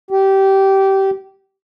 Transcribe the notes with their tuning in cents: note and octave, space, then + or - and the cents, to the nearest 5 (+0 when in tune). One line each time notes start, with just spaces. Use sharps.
G4 -20